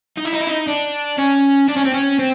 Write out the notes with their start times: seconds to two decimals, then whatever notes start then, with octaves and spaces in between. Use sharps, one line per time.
0.17 D#4
0.25 E4
0.33 D#4
0.40 E4
0.47 D#4
0.67 D4
1.18 C#4
1.68 D4
1.77 C#4
1.85 C4
1.94 C#4
2.19 C4